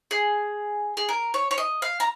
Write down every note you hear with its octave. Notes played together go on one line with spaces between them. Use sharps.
G#4
G#4
A#4
C#5
C#5
D#5
F5
A#5